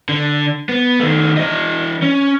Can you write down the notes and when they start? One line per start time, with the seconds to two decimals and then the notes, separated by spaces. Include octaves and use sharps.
0.09 D3
0.69 B3
1.00 D#3 A3
1.37 E3 D#5
2.02 C#4